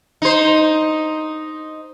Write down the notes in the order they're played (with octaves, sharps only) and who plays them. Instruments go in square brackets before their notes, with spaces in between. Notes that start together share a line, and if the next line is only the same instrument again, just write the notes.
[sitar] D#4 C5